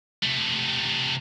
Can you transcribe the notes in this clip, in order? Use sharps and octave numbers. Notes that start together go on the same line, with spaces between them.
C3 A3